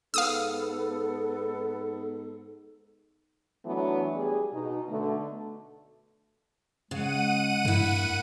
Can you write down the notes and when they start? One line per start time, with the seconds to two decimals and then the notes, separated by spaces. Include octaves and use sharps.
0.14 G#2 B3 A4 F5 D#6 E6
3.66 E3 F#3 A3 B3 D4
4.15 G3 G#4
4.53 B2 D#4
4.89 B2 D3 A3
6.91 C#3 G#3 F#5 D#7
7.65 G2 A#3 E4